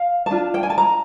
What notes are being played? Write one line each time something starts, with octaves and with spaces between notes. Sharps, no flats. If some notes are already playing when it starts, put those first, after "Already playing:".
Already playing: F5
A5
D4 F4
G5
G#5
A5
A#5